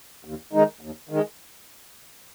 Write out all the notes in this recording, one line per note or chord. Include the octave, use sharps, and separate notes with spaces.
D#2
D#3 G#3 D#4
D#2
D#3 G#3